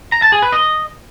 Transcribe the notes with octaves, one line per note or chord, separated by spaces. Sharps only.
A#5
A5
G#4
B4
D#5